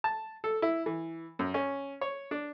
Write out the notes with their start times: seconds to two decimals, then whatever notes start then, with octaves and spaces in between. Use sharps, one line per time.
0.04 A5
0.44 A4
0.62 E4
0.86 E3
1.39 F#2
1.54 C#4
2.01 C#5
2.31 D4